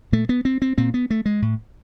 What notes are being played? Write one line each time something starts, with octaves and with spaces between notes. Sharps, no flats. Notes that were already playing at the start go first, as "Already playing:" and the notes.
A#2 A3
B3
C4
C4
A#2 C4
B3
A3
G#3
A2